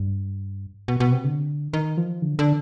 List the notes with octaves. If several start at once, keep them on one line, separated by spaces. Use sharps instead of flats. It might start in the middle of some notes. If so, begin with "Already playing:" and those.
Already playing: G2
B2
B2
C3
D3
D#3
F3
D3
D3